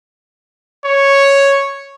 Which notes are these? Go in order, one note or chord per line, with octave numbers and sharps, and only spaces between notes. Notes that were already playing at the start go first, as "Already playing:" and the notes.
C#5